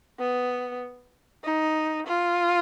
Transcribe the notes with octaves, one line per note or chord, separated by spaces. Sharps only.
B3
D#4
F4